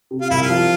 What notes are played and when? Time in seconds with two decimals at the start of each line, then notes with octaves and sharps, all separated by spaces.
0.11 C3
0.21 F4
0.30 C2 E4
0.42 F4
0.49 F3